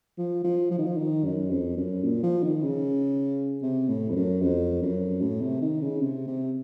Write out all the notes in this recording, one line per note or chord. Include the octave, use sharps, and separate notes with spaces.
F3
F3
F3
D#3
F3
D#3
F#2
F2
F#2
A#2
F3
D#3
C#3
C3
A2
F2
F#2
F2
F#2
A2
C3
D#3
C#3
C3
C3